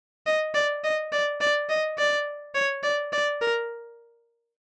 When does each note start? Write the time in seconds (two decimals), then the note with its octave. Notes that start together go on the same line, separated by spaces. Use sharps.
0.26 D#5
0.55 D5
0.84 D#5
1.12 D5
1.41 D5
1.70 D#5
1.98 D5
2.55 C#5
2.83 D5
3.13 D5
3.41 A#4